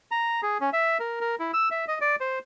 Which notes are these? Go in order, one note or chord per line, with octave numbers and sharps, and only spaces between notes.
A#5
G#4
C#4
E5
A#4
A#4
E4
E6
E5
D#5
D5
C5